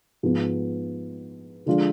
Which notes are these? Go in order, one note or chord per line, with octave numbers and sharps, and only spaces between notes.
G#2 F3 G#3 B3
D3 F3 G#3 D4 F4